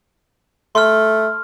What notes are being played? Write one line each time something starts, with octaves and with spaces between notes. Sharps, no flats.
A3 C6 F6